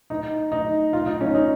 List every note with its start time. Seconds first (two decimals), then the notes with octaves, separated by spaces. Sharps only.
0.10 D#4
0.52 D#4
0.93 F4
1.06 D#4
1.21 C#4
1.35 D#4